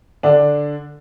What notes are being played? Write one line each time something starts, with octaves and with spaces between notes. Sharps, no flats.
D3 D4